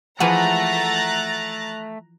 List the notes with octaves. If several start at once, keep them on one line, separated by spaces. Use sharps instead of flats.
E3 F3 A3 G#4 F#5 A#5 F#6 A6